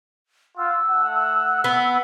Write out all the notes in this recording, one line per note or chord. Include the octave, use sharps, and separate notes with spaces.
F4 F#5 E6
A3 F#5
B3